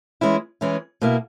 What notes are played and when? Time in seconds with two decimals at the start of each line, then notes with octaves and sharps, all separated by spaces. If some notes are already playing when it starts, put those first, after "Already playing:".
0.21 E3 G#3 C#4 E4
0.61 E3 G#3 C#4 E4
1.01 B2 A#3 E4